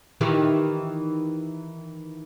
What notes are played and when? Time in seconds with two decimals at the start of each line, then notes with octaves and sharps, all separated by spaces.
0.21 D#3 E3 G4